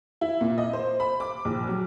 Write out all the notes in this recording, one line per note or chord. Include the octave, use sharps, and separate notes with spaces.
E4
A#2
D#5
C5
B5
D6
A#1
F#3